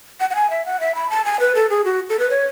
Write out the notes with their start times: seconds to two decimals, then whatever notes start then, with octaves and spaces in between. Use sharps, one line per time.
0.20 F#5
0.30 F#5
0.35 G#5
0.50 E5
0.65 F#5
0.80 E5
0.95 B5
1.10 A5
1.25 G#5
1.40 B4
1.55 A4
1.70 G#4
1.85 F#4
2.10 A4
2.19 B4
2.30 C#5